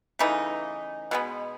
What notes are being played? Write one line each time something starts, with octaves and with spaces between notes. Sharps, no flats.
C#3 E3 A3 D#4
B2 G#3 B3